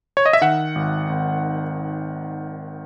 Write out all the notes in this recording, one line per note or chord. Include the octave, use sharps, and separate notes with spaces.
C#5
D#5
E5
D#3 F#5
G#1
G#1